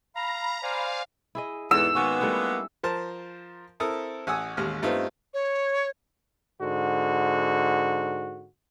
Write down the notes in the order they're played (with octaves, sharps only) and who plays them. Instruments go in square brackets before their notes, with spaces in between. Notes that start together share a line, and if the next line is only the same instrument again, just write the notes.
[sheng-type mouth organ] F5 [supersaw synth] A#5 [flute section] B5
[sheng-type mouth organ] C5 D5 G#5 [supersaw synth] F5
[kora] E4 G#4 D#5
[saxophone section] E2 [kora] G#2 A4 [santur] E6
[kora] D#3 C#4 F#4 [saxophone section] G#3 A#3 B3
[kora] G3 A3 E4
[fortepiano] F3 A#4 C5 A5
C4 E4 A4 A#4 D#6
A1 F#5 G#5 D#6 E6
A1 D#2 G#3 F6
G2 A3 B3 C4 D#4 F4
[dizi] C#5
[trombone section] G#2 D3 F#4